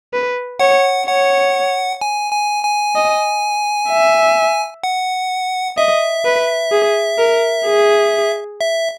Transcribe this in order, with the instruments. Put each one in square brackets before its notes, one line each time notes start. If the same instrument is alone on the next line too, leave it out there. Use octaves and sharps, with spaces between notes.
[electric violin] B4
[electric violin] C#5 [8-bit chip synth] F#5
[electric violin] C#5 [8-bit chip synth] F#5
[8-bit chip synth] G#5
G#5
G#5
[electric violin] D#5
E5
[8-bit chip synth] F#5
[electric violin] D#5 [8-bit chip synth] E5
[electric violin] B4
G#4
A#4
G#4
[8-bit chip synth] E5